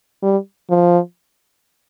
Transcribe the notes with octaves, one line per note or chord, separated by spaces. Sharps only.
G3
F3